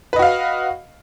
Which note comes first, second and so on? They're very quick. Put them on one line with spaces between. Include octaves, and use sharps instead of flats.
B4 D#5 F#4 F5